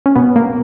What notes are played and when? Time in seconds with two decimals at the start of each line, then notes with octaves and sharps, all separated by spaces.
0.06 C#4
0.16 B2 B3
0.36 B2 A#3